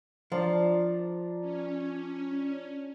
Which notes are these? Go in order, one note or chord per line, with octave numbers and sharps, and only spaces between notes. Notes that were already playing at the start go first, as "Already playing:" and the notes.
F3 D4 A#4 D5
C#4